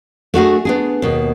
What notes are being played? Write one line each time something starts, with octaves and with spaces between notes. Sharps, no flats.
A3 D4 F#4 G#4
B3 D4 G#4
D#2 B2